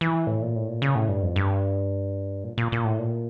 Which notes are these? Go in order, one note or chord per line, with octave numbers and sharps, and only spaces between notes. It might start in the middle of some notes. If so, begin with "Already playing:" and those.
E3
A2
A#2
A2
A#2
C#3
A2
G2
F2
G2
A#2
A#2
A#2
A2
A#2